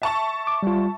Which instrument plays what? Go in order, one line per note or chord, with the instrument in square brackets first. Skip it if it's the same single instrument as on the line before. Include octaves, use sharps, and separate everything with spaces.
[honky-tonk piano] E5 A5 C#6
[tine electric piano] D6
G3 F4